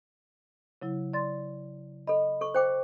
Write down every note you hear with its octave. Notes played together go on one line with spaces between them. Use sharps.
C#3 F#3 E4
D5 C6 A6
A4 D#5 B5
A4 C#6
C5 G5 D6